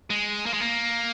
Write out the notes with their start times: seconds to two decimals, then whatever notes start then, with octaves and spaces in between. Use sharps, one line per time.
0.10 G#3
0.46 A#3
0.53 G#3
0.60 A#3